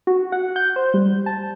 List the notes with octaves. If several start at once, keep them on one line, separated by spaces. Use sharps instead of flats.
F#4
F#5
G6
C5
G3
A5